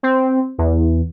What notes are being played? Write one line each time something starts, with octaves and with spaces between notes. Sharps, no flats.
C4
E2